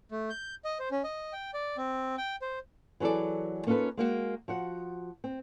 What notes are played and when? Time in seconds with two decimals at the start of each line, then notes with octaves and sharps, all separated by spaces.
0.11 A3
0.30 G6
0.65 D#5
0.79 C5
0.91 C#4
1.04 D#5
1.33 G5
1.54 D5
1.77 C4
2.18 G5
2.42 C5
3.00 E3 F#3 G#4 A4 D5
3.67 A#3 C#4 D#4 F4 A4 B4
3.97 G#3 A#3 F#4
4.48 F3 F#4 F#5
5.24 C4